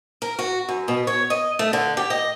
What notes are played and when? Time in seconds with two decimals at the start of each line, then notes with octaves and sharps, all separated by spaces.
0.22 A#4
0.39 F#4
0.69 F#2
0.88 B2
1.07 C#5
1.30 D#5
1.59 A3
1.73 D3
1.97 G4
2.10 D#5